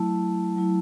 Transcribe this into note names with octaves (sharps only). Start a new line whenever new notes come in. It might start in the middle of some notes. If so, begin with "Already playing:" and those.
Already playing: F#3 A3 E4 A5
F#3 A3 E4